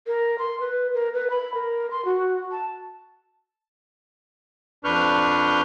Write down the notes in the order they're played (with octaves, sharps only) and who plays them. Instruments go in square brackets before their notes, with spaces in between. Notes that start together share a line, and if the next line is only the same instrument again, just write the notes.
[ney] A#4
C6
B4
A#4
B4
B5
A#4
C6
F#4
A5
[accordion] F2 D4 B4 C#6 F6 G6